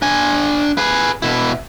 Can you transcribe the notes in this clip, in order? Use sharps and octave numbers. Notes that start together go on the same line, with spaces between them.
D4 G#5
G#4 B4
B2 E4